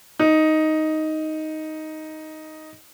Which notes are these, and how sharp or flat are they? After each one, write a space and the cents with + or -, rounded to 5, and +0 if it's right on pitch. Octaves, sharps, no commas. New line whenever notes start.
D#4 +5